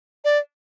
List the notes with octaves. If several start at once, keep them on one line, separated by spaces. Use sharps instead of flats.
D5